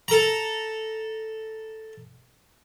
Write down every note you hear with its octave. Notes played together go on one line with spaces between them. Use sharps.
A4 A#5